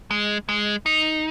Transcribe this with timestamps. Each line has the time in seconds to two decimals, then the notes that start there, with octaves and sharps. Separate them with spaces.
0.11 G#3
0.49 G#3
0.86 D#4